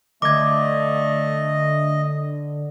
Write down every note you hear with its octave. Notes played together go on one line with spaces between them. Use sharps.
D3 A3 D#5 D6 G#6